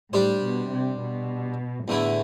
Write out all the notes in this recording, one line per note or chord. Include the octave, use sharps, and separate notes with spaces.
A2 G3 D4 G4 C5
B2
C3
B2
E2 A2 D3 A3 E4